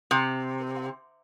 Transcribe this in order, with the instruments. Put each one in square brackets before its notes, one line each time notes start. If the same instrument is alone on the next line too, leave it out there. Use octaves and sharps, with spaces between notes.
[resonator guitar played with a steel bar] C3